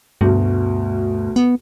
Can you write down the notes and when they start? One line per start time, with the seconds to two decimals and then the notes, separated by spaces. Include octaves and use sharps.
0.21 D2 G2 B2
1.36 B3